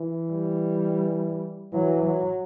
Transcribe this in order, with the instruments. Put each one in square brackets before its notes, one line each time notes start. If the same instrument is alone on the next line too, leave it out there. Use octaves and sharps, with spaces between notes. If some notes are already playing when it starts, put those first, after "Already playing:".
Already playing: [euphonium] E3
[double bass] G3
[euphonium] E3 [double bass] F#3
[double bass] F#3